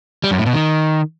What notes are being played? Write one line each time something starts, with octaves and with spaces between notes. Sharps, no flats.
G3
F#2
A2
B2
D#3